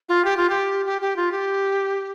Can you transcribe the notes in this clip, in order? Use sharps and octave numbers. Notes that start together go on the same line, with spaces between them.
F4
G4
F4
G4
G4
G4
F4
G4